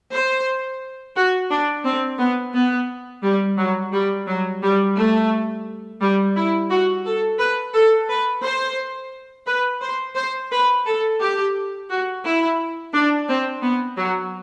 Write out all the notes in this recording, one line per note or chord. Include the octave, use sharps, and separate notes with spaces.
C5
F#4
D4
C4
B3
B3
G3
F#3
G3
F#3
G3
A3
G3
E4
F#4
A4
B4
A4
B4
C5
B4
C5
C5
B4
A4
G4
F#4
E4
D4
C4
B3
F#3